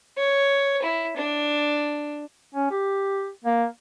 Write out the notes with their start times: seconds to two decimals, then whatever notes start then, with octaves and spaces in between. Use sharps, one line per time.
0.17 C#5
0.82 E4
1.16 D4
2.55 C#4
2.71 G4
3.45 A#3